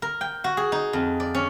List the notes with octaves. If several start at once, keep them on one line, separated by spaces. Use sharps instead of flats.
A#4
G5
F#4
G#4
D#4
F2
D5
C#4